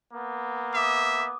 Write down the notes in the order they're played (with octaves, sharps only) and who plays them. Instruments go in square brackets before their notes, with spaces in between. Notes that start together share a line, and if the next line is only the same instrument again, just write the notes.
[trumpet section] A#3 B3
[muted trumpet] E5 [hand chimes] D6 D#6